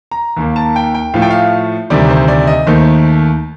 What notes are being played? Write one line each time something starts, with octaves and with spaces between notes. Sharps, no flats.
A#5
D#2 D#3 A#3
A5
G5
G5
A2 F3 A3 F5
G5
F5
D2 C3 D#3 G3 D5
C5
D5
D#5
D#2 D#3 A3 C5